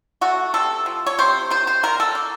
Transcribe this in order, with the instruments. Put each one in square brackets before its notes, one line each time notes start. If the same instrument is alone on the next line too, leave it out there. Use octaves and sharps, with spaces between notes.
[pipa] A3 F#4
C3 A4
F3
C#5
C3 C5
D#3 C5
C5
D#3 A#4
A4
A#3